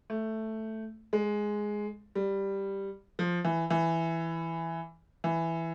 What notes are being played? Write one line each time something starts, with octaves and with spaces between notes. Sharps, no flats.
A3
G#3
G3
F3
E3
E3
E3